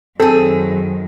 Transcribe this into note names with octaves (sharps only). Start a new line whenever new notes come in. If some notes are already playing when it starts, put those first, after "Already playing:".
F#2 D#3 C4 G#4 A4